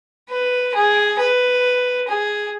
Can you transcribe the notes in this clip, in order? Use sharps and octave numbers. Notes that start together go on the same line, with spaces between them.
B4
G#4
B4
G#4